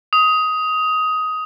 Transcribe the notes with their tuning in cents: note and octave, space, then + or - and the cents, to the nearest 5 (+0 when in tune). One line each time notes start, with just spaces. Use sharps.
D#6 +15